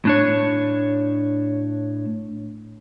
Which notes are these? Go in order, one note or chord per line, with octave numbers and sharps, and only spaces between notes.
A2 D4 C#5